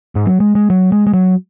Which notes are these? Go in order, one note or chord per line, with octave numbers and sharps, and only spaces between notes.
G#2
F#3
G#3
G#3
F#3
G#3
G#3
F#3